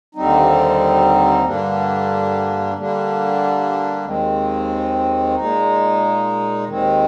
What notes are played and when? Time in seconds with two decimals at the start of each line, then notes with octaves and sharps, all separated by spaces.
0.15 D#2 D3 G3 C4 D#4
1.44 G2 D3 G3 A#3 D4
2.75 D3 G3 A#3 D4
4.05 D#2 D#3 G#3 C4
5.35 A#2 G#3 D#4
6.66 D#2 D#3 G#3 C4